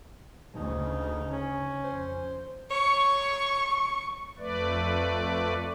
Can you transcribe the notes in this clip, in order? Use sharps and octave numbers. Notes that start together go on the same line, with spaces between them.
D2 C#3 D#4
C#4
F2 C5
C#5 C#6
F2 A3 B4 D5